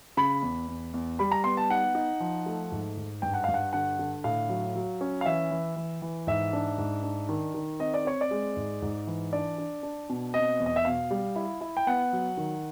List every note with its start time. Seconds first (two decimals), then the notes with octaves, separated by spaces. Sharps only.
0.17 C#3 B5
0.42 E2
0.68 E2
0.94 E2
1.19 G3 B5
1.31 A#5
1.44 B3 C6
1.57 A5
1.70 D#4 F#5
1.95 D#4
2.20 F3
2.46 A3
2.72 G#2
2.97 G#2
3.22 G2 G5
3.34 F#5
3.44 G2 F5
3.54 F#5
3.73 D3 F#5
3.99 D3
4.24 A2 F5
4.49 F#3
4.76 F#3
5.01 C#4
5.21 F5
5.26 E3 E5
5.51 E3
5.76 E3
6.02 E3
6.27 G#2 E5
6.53 D4
6.78 G#2
7.03 D4
7.29 D#3
7.54 D#3
7.80 C4 D#5
7.94 D5
8.05 C4 C#5
8.21 D5
8.31 G#3
8.57 G#2
8.82 G#2
9.07 E3
9.33 D4 D5
9.58 D4
9.83 D4
10.10 B2
10.34 C4 D#5
10.60 E2
10.66 D#5
10.76 E5
10.85 B2 F5
11.11 G3
11.36 E4
11.61 E4
11.77 G5
11.87 B3 F#5
12.13 F#3
12.37 D#3